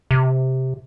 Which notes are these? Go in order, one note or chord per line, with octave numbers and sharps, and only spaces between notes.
C3